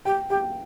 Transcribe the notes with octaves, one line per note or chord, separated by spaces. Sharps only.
G4 G5
G4 G5